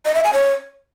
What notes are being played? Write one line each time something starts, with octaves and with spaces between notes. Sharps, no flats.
D#5
E5
G#5
C#5